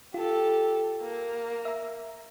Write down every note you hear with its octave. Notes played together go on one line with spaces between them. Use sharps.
F4 G4 A4
A#3
E5 A#5